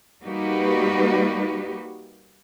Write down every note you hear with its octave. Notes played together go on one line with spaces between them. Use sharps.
G3 A#3 D#4 F#4 G4 B4